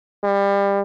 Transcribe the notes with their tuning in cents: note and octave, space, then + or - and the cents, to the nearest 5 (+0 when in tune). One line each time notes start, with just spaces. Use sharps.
G3 +25